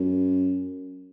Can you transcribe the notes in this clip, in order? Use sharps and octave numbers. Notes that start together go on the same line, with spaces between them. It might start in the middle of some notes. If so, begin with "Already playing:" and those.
Already playing: F#2